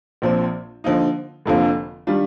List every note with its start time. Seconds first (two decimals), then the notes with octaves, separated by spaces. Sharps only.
0.22 A#1 A#2 F3 C4
0.84 D3 F3 A#3 D#4
1.45 F1 F2 D3 F3 A#3
2.07 D#3 G3 D4 F4